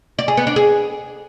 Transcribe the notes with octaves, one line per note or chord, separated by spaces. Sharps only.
D5
G#4
B3
D4
G#4